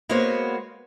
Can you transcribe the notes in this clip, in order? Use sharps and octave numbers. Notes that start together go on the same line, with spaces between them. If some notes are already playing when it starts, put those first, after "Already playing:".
G#3 A#3 B3 F#4 C5 C#5